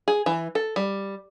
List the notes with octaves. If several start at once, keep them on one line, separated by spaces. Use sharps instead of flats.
G#4
E3
A4
G3